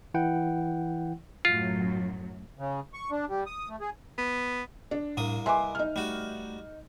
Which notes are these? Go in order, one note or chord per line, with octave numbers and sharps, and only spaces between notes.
E3 E4 F#5 G5
F#2 A2 F#3 F4
C#3
C#6
D4
G3
D#6
A3
G#4
B3
D4
C2 A2 A#3 D#6
B4 D#5 E5 G#5 C6 D6
D#4 F6
G3 A3 F#4